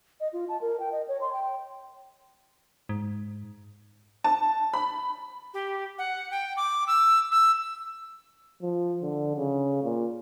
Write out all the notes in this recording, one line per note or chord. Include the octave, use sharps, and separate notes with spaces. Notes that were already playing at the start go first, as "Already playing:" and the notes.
D#5
F4
A5
A#4
G5
D#5
C#5
C6
G5
G#2
A5
B5
G4
F#5
G5
D6
E6
E6
F3
D3
C#3
A#2